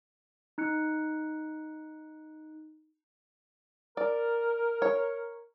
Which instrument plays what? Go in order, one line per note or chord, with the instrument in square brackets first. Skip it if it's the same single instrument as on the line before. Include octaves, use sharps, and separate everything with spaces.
[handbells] D#4 F#6 C#7
[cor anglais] A#4 [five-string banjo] D5
[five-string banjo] C#5